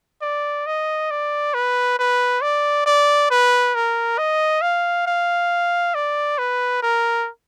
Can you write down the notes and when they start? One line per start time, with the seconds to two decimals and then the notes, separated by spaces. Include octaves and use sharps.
0.22 D5
0.67 D#5
1.11 D5
1.54 B4
1.99 B4
2.42 D5
2.86 D5
3.31 B4
3.75 A#4
4.18 D#5
4.62 F5
5.07 F5
5.95 D5
6.38 B4
6.83 A#4